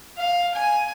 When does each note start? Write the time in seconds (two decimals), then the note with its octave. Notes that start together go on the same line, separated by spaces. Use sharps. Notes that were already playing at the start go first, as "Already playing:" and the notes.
0.17 F5
0.55 G#5